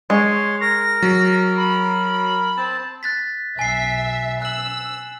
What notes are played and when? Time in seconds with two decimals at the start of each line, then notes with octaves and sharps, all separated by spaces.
0.10 G#3 C#5 C6
0.61 A#4 A#6
1.02 F#3
1.57 B5
2.57 C4 A5
3.03 F#6 A6 B6
3.59 B1 E5 G#5 C7
4.42 E6 F#6 F#7